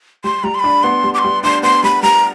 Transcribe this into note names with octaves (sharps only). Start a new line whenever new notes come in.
G3 C6
G3 A#5
C6
D4 B5
B3 C6
G3
D6
C6
G3
D4 C6
B3 C6
G3 B5
G3 A#5